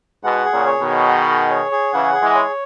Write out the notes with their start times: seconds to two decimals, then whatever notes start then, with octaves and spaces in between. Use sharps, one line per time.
0.23 G#2 B2 F#5
0.45 G#4
0.52 A#2 C#3
0.66 C#5
0.80 B2 D#3
0.87 G#4
1.08 F#5
1.30 G#4
1.51 C#5
1.71 G#4
1.92 C#3 E3 F#5
2.13 G#4
2.21 E3 G#3
2.35 C#5